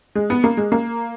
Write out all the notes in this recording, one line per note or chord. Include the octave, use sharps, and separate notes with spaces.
G#3
B3
A#3
G#3
A#3